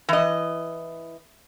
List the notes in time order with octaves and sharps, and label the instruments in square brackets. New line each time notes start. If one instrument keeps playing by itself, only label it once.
[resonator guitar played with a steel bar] E3 D#5